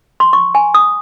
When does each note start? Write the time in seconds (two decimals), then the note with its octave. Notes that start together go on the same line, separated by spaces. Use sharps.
0.20 C6
0.33 C#6
0.55 G#5
0.74 D#6